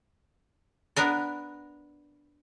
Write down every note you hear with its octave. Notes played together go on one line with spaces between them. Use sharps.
B3 D4 A#4 D5